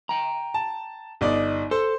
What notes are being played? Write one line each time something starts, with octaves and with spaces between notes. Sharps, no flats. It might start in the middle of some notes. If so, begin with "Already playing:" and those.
G5 A#5
A5
G1 D#4 D5
A4 C5